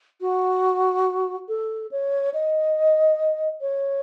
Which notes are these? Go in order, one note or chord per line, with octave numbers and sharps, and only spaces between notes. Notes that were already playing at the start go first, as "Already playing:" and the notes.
F#4
A4
C#5
D#5
C#5